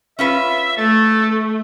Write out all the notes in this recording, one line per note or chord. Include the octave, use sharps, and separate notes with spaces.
C#4 F4 B4 E5
A3 A4